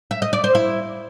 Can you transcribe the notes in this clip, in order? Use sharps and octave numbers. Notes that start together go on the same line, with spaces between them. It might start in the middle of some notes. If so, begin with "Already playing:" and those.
E5
D#5
D5
C5
E4